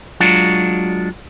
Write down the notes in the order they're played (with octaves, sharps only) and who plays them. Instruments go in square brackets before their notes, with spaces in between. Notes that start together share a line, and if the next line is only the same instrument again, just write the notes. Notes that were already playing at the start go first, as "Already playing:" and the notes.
[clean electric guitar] F#3 G#3 D4 F4 F#4